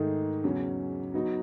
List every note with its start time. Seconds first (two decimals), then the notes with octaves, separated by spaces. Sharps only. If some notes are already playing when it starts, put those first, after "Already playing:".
Already playing: G#2 D#3 A3 D#4 G#4
0.43 E2 C#3 F#3 C#4
1.14 F#3 B3 D#4 F#4